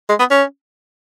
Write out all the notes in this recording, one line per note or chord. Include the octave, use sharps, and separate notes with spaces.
G#3
B3
C#4